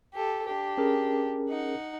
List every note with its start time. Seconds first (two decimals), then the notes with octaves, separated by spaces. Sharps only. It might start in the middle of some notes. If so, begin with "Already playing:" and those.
0.14 G4 A4
0.46 D4 G4
0.78 C#4 G#4 A#4
1.49 D#4 F#5